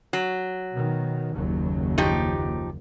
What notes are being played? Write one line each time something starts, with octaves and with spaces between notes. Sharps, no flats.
F#3
B2 D#3
F#1 D#2 F#3
F3 D#4 G4